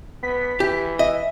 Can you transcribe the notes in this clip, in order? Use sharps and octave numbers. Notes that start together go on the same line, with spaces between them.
B3 B6
E3 G4
D#5 E5